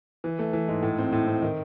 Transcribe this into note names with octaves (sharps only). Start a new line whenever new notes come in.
E3
A3
E3
G#2
A2
C4
A2
C4
D#3